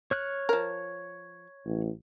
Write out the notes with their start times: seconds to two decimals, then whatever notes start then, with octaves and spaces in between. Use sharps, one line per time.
0.11 C#5 F6 F#6
0.49 F3 A#4
1.65 A1